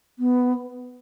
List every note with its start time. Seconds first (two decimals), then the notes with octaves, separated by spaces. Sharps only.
0.19 B3